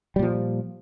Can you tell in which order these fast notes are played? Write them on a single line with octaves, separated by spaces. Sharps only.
G3 A#2 F3